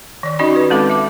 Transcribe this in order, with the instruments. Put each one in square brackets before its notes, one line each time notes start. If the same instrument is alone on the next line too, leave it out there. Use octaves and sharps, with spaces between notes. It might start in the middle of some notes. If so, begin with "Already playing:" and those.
[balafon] D#3 D5
C#4 D#4 F#4 D5 D#5 B5
F4 B4
G#3 C4 A4 F5 B5 D6
E5 D6